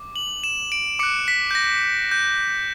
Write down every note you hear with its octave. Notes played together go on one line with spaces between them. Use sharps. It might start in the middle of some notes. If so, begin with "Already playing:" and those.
Already playing: D6
F#7
E7
D7
D6 F#6 C#7
B6
G6
A#6
G6